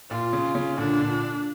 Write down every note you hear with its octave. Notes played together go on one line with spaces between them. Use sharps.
A#2 F4
C#3
C#3
A#2 D3 D4
A#2 D3